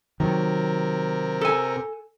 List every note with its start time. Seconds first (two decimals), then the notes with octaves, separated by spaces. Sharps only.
0.20 C3 D#3 F#3 A#4
1.41 A4 G#5